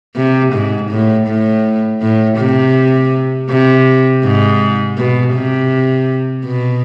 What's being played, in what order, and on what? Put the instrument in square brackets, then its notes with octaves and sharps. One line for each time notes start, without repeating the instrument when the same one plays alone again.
[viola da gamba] C3
G#2
A2
A2
A2
C3
C3
G#2
B2
C3
B2